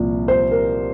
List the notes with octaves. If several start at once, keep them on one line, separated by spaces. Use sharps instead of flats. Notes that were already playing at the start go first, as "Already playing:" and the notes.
Already playing: C2 A#2 F3
C5
A#4